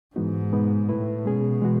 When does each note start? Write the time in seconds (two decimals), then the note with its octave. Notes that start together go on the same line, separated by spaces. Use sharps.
0.16 G#2 E3 G#3 B3 D#4 F#4
0.52 B2 G#3 B3 D#4
0.88 A2 A3 E4 B4
1.25 B2 G#3 C#4 G#4
1.62 E3 G#3 B3 F#4